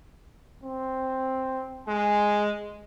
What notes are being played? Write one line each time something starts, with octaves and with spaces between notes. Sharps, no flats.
C4
G#3 G#5